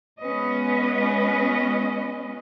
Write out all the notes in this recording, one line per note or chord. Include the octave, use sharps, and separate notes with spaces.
G#3 B3 C#4 F4 B4 D#5